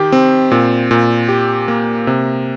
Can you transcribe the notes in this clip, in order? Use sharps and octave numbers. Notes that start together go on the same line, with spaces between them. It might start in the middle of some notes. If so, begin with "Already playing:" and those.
Already playing: D#3 G4
C4
A#2
A#2
G4
A#3
C3